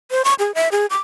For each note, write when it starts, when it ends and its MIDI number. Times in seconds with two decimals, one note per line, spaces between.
0.11 0.22 72
0.25 0.34 85
0.39 0.54 68
0.55 0.69 76
0.72 0.86 68
0.90 1.00 86